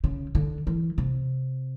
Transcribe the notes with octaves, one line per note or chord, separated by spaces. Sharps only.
C#3
D3
E3
C3